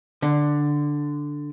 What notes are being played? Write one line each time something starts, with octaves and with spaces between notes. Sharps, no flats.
D3